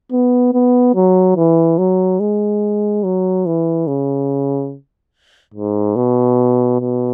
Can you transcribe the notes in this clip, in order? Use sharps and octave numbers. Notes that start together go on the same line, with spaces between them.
B3
B3
F#3
E3
F#3
G#3
F#3
E3
C#3
G#2
B2
B2